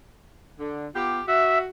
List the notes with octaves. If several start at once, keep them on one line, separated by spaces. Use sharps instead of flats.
D3
B3 F4 G4
F#4 E5